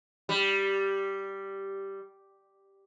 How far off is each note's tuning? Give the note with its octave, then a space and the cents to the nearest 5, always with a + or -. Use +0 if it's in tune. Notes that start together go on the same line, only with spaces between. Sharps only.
G3 -5